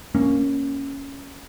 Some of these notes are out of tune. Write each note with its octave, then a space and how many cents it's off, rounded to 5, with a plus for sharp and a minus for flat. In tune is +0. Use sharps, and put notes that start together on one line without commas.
A#3 +0 C#4 +0